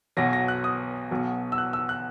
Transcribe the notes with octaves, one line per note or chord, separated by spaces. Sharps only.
B1 B2 F#3 A#6
A#6
F#6
D#6
B1 B2 F#3
E6
F#6
E6
F#6